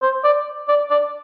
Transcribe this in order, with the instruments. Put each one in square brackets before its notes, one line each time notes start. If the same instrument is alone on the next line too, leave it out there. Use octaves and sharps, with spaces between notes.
[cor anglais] C5
D5
D5
D5